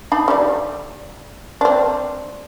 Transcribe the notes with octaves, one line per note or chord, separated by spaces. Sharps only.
D4 D#4 B5
D3 G3
C4 D4